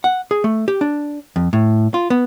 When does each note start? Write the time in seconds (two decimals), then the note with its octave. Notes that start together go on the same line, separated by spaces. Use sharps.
0.04 F#5
0.31 G#4
0.44 A3
0.68 G4
0.81 D4
1.36 F2
1.53 A2
1.94 F4
2.10 B3